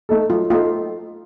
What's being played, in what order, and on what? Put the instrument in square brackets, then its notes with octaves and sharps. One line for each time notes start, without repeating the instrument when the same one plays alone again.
[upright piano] A3 D#4 A4
[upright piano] F#3 [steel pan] F4
[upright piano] A3 D#4 A4 [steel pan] F4